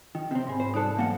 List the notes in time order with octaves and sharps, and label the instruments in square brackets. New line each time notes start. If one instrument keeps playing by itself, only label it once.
[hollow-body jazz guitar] D#3
C3 C4
[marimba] G#2 G#5 B5
[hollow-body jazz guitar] C5
[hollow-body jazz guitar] C2 G2 A4 [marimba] D#4 D5 F#6
[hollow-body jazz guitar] B1 A#3 F#5 [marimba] E3 F#3